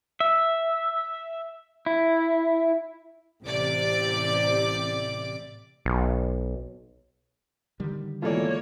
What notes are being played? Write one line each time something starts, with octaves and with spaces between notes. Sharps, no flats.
E5
E4
A1 C3 D5 D6
B1
D3 D#3 G3
G#2 B2 E3 A#3 F4 A4 C#5 D5